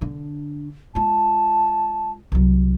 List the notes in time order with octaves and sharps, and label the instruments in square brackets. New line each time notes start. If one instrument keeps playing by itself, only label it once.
[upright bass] D3 D4
[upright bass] G#3 F4 [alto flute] A5
[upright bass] C2 F#3